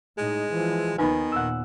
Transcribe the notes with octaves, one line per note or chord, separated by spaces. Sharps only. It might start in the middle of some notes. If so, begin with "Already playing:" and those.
A2 G#3 D#4
E3 F3
D#2 D#3 B3 D#4 B4 G#5
D#2 A#2 F#5 E6